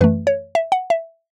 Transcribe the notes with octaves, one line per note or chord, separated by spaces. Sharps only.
F#2 E3 A3 B4
C#5
E5
F#5
E5